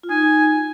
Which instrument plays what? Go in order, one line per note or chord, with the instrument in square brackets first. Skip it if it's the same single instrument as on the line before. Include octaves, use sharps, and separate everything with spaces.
[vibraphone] F4
[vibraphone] D#4 [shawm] G#5